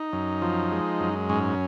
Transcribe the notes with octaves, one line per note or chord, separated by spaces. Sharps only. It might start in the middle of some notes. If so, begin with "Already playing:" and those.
Already playing: D#4
F#2
F3
G#3
F#2
G#2 C#4